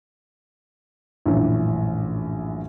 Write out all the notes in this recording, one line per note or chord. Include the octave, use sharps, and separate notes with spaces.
A#1 F#2 A2 E3